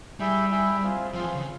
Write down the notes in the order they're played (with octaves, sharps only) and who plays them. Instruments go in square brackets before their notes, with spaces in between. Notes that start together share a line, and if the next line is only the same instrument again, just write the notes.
[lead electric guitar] G3 [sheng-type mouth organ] E4 G#4 E5 G5
[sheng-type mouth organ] E4 G#4 E5 G5
C4 F4 G#4
[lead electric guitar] F3 [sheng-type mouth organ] C4 F4 G#4
[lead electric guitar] E3
C#3